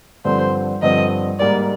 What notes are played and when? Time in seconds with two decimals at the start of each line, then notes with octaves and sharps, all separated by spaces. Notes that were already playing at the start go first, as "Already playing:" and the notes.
0.25 G2 D3 F3 C4 C5
0.82 G2 D3 F3 C4 D#5
1.39 G#2 G3 A#3 D5